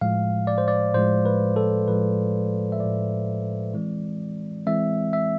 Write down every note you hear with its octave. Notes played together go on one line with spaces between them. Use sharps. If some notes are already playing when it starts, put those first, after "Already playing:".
A2 F3 G#3 F5
D5
C5
D5
A2 F3 G#3 C5
B4
A4
A2 F3 G#3 B4
E5
A2 F3 G#3 D5
E3 G#3 C4
E3 G#3 C4 E5
E5